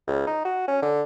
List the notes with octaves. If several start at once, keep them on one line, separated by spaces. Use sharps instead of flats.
C#2
D#4
F#4
C#4
D3